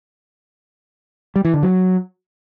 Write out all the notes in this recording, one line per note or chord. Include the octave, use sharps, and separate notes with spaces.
G3
E3
D3
F#3